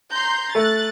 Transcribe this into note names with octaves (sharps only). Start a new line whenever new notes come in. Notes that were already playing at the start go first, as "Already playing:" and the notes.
A#5 C6 G6
A3 F#6 A6